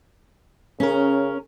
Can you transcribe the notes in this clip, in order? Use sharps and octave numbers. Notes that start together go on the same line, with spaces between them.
C#3 C#4 A#4